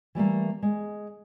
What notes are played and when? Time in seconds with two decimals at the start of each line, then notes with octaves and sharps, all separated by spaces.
0.15 E3 G3 A3 A#3
0.62 G#3